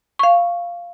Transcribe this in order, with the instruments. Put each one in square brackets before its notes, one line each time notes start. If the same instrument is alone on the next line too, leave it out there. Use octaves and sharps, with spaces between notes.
[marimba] F5 C#6